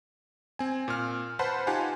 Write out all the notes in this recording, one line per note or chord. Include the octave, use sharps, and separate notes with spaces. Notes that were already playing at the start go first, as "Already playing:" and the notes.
C4 G#5
A#2 F6
B4 C5 F#5 A5 B5 C6
D#4 F4 G4 F#5 G#5 A5